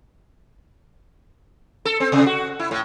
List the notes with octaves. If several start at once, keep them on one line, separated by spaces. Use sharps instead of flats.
A4
C4
C3
F#4
E4
A2